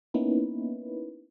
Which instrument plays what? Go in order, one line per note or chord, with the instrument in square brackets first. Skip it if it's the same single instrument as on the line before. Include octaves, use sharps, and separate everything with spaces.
[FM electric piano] A#3 B3 C#4 D#4 E4 B4